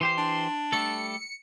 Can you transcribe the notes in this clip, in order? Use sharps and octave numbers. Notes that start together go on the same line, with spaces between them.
E3 G4 C5 C6
D4
G3 A3 A4 C#7